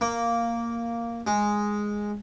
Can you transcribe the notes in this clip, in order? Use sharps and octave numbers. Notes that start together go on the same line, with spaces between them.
A#3
G#3